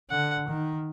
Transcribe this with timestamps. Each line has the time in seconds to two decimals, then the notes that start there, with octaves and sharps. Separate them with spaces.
0.10 D3 F#5
0.48 D#3